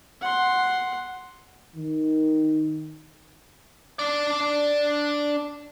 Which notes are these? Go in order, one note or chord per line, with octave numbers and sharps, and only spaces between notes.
F#5 C6
D#3
D4 D5